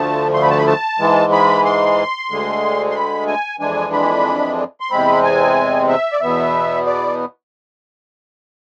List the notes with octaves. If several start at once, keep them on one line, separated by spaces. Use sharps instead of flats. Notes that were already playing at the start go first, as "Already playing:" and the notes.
Already playing: D2 D3 F3 A3 A5
C6
B5
A5
B5
A5
G#2 E3 G#3
B5
C6
D2 D3 G#3
C6
B5
G#5
F2 E3 G#3 D4 G#5
B5
C6
E2 C3 G#3 C4 B5
G#5
E5
D5
E2 B2 B3 E5
D5